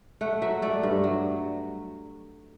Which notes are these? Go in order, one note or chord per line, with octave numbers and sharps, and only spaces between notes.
A3 F#5
F#3 E5
A3 D5
G2
F#3